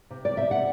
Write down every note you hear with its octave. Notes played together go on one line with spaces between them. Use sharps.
C3
D5
C3 E5
F#5